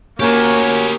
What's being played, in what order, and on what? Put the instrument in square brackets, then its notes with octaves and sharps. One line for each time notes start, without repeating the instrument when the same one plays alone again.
[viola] A#3 [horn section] C#4 F#4 C#5 [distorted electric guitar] G4 A#4